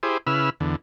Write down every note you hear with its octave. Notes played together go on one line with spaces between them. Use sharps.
E4 G4 G#4 C5
C#3 E4 B4 E6 F6
E2 D3